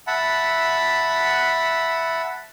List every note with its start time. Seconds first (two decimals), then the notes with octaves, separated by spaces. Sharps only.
0.07 E5 F#5 A5 B5